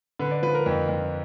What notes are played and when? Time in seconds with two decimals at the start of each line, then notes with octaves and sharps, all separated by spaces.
0.19 D3 B4
0.31 D5
0.42 F3 B4
0.55 A#4
0.66 F2
0.89 F2